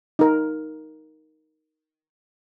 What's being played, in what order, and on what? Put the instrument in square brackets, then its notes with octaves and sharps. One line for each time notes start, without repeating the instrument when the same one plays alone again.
[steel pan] D#4 A#4